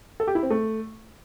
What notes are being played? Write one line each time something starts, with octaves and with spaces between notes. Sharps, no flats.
A4
G4
E4
C4
A3